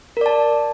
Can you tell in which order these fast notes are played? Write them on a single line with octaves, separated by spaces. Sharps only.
A#4 D5 A5